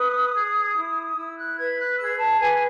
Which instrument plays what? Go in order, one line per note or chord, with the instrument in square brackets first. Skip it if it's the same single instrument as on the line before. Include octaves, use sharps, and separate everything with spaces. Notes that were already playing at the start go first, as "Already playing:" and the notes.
Already playing: [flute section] B4 D#6
G#4
E4
E4 E6
F#6
B4 G#6
F#6
G#4 E6
A5
B4 G#5